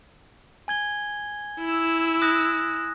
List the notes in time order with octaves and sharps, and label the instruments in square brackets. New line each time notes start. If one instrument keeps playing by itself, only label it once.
[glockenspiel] G#5 G#6 G7
[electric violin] E4 E6
[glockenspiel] D#6 F#6 A#6